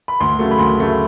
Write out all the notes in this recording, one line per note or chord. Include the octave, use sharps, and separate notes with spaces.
B5
D2 C6
C#3 F#3 A3
B5
D2 C6
C#3 F#3 A3